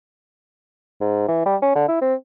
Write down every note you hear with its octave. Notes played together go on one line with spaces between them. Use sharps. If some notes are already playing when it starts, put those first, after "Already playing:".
G#2
E3
G3
C#4
D3
E4
C4